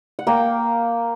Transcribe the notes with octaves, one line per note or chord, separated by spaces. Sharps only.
F#5
A#3 G5